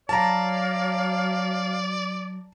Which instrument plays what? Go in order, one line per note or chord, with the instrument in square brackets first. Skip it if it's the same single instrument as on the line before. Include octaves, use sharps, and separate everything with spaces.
[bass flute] F#3 [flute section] C#5 F5 F6 [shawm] D5 [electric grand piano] A5 A#5